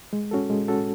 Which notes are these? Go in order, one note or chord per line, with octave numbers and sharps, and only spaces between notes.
G#3
C#4 F#4 A4
G#3
C#4 F#4 A4